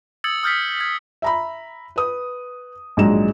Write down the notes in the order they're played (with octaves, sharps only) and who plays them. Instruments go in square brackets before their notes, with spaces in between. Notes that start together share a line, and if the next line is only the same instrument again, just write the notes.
[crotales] D#6 E6 G#6 A6 C#7 F#7
D#6 F6 G6 A6 B6 C#7
F6 G#6
[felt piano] E5 A#5 B5
B4 D#6
A#1 G#2 F#3 G#3 A#5 E7